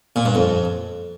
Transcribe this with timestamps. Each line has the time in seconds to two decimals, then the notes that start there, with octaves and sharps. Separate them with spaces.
0.16 A#2
0.25 G2
0.35 F2